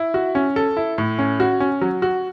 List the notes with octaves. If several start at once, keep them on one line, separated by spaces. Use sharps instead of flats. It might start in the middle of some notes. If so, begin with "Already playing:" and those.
Already playing: E4
F#4
C#4
A4
E4
A2
C#4
F#4
C#4
F#3
F#4